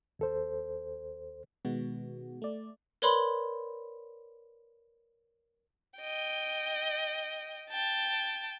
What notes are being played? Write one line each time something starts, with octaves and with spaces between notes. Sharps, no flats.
D#2 A4 C5
B2 D#3 G#3 B3 F#4
A3 D5
A#4 B4 C#5 D5 B5 C6
D#5 G5
G5 A5